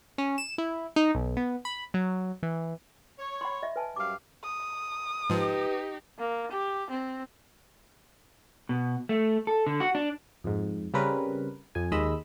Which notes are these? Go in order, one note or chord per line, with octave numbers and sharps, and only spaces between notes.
C#4
E7
E4
D#4
B1
B3
B5
F#3
E3
C#5
F#5 B5 C6
D#5 E5
B4 G#5 A5
F#2 G3 F5 D6
D#6
G#2 F3 D#4 G4 B4
A#3
G4
C4
B2
A3
A4
D3
F#4
D4
F2 G#2
C#3 G3 C4 C#4 A#4 B4
F2 G#5
D#2 G#3 D#5 B5 E6